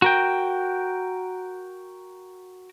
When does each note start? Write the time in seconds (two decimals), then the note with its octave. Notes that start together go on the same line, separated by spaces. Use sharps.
0.02 F#4 A#4 G5